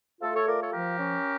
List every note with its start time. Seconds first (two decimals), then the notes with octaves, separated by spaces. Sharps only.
0.21 A3 F4 A4
0.34 A4 C#5
0.47 F4 A#4 D5
0.60 A4 C#5
0.73 F3 G4 A#4
0.99 C#4